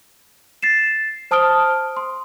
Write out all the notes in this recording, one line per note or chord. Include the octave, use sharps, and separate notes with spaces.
A6 C7 E7
C5 A5 D#6 F6 D7 G7
C6